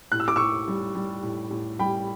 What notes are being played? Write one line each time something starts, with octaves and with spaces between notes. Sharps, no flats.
A2 F#6
E6
D6
A2 C#6 E6
G3
G3
A2
A2
G3 G5 B5